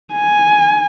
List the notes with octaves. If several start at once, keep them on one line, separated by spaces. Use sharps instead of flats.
G#5